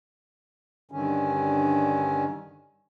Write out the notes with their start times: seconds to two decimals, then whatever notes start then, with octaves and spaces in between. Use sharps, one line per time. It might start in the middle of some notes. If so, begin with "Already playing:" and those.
0.91 G2 D3 D#3 C#4